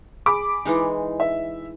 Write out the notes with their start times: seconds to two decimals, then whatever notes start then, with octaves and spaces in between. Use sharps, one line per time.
0.26 G#4 B5 D6
0.66 E3 G#3 D#4
1.20 E5